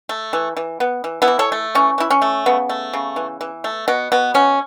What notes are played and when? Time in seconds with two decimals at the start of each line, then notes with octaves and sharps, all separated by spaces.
0.09 A3
0.33 E3
0.57 E3
0.80 B3
1.04 E3
1.22 B3 E4
1.28 E3
1.39 A4 C#5
1.52 A3
1.75 E3 C#4
1.98 E3 E4
2.10 C#4
2.22 A3
2.46 C#3 B3
2.69 A3
2.93 C#3
3.16 E3
3.41 E3
3.64 A3
3.88 B2 B3
4.12 B2 B3
4.34 B3 C#4